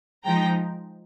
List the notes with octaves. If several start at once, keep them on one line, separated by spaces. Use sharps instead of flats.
F3 G#3 D#4 G5 A#5